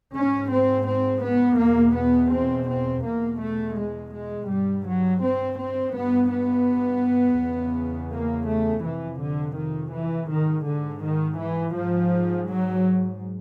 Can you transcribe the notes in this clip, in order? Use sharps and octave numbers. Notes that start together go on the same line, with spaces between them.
G#2 C#4
C4
C4
B3
E2 B2 A#3
B3
C4
C4
E2 B2 A#3
A3
G#3
G#3
G2 G3
F#3
C4
C4
G2 B3
B3
E2 C#3
A#3
A3
F2 C3 E3
D3
D#3
E3
G#2 D#3
D3
D#3
E3
G#2 F3
F#3